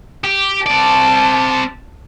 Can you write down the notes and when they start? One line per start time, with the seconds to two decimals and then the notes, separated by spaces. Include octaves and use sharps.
0.24 G4
0.66 C4 D5 A5